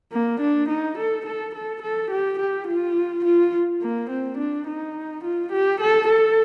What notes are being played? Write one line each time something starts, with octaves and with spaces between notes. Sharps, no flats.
A#3
D4
D#4
A4
A4
A4
A4
G4
G4
F4
F4
A#3
C4
D4
D#4
F4
G4
A4
A4